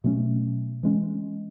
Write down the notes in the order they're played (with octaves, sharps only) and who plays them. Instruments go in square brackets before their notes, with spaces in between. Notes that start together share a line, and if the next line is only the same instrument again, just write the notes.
[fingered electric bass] B2 F#3 A3 C#4
E3 G#3 C#4